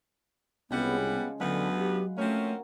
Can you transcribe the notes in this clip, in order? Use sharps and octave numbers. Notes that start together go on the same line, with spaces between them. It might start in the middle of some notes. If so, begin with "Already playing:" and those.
C2 C#3 F3 G3 G#3 B3 F#5
F3 B3
D2 D3 F#3 B3 F5 F#5 B5
G4
F3 A3 A#3 C4 C#4 F#4